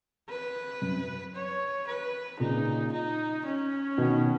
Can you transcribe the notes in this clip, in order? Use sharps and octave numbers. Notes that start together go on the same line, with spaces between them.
B4
F#2
C#5
B4
A#2 C#3 D#4
D#4
C#4
B2 D#3